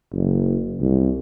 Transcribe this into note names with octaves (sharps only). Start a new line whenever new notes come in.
F#1
C2